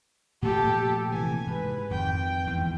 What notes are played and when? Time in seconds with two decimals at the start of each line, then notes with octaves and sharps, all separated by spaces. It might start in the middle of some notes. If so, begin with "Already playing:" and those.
0.42 A#2 F3 A3 G4 A4
1.12 C3 E3 G#5
1.47 G#2 B4
1.91 F2 D#3 G5
2.47 E2 G#2